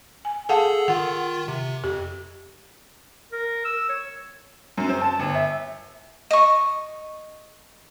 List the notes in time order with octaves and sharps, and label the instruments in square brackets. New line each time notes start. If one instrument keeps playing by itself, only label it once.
[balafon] G#5
[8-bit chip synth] G#4 A4 [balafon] F5 F#5 A5
[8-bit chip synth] D#3 F4 [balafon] F#5
[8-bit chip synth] C3
[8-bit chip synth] F2 [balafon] G4
[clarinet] A#4
E6
C#5
[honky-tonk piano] F#2
C4
A5
G1
E5
[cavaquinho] D#5 C#6